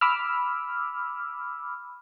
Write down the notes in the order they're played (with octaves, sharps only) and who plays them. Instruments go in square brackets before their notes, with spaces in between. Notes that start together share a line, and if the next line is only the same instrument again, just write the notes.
[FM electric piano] B5 D6 E6 F6